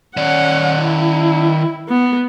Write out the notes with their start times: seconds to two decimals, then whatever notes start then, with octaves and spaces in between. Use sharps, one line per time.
0.17 D#3 C#4 D5 F#5
0.81 E4
1.88 B3